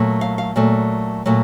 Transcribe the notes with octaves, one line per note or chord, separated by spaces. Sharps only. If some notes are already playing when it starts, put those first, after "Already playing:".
Already playing: A#2 F#3 A3
F5
F5
A#2 F#3 A3
A#2 F#3 A3